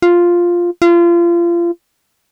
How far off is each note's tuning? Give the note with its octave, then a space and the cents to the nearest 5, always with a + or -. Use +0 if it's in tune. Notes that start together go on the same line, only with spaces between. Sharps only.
F4 +0
F4 -30